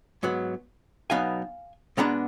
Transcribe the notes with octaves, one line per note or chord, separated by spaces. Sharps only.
G#2 F#3 B3
B2 F#3 B3 D#4 F5 G#5
B2 G#3 B3 D4 F#5 A#5